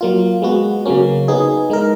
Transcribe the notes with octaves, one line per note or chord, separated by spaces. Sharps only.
F#3 A#3 F4
G#3 B3 F#4
C#3 F#3 A#3 C#4
B3 D#4 G#4
G#3 D#4 A#4